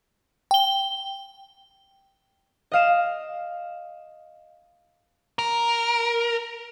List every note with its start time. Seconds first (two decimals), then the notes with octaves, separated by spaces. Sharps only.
0.51 G5 G7
2.72 D#5 F5 E7
5.39 A#4